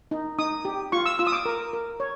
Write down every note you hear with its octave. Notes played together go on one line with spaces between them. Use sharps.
D#4
D#4 D#6
G4
F4 C#6
E6
F4 E6
D#6
D6
A#4
A#4
C#5